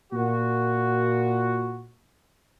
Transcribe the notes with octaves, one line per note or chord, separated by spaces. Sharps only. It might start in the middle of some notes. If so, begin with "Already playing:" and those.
A#2 F#4